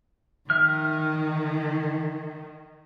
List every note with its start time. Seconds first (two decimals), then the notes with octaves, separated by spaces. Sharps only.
0.50 D#3 E5 F6